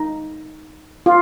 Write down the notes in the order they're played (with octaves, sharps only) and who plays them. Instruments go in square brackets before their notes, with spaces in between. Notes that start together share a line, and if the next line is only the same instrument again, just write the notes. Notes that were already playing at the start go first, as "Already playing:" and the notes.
Already playing: [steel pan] D#4
F4